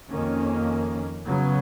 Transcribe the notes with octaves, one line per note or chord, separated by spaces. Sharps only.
F2 D#3 A#3 C#4
C#3 F#3 B3